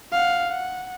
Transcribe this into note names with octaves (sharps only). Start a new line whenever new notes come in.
F5 F#5
F#5